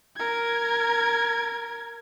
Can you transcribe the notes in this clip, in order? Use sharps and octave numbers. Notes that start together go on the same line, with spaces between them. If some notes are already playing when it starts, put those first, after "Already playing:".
A#4 G#6